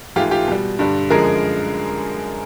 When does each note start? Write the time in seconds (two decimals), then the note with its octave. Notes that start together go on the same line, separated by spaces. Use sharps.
0.16 G#2 E3 A3 F4 G4
0.31 F4 G4
0.48 B2 G3
0.79 G2 D3 G3
1.10 F#2 D3 F3 G#3 G#4 A#4